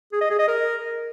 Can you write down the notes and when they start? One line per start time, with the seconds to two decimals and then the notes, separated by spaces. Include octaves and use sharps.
0.13 G#4
0.21 D#5
0.30 G#4
0.39 D#5
0.48 A#4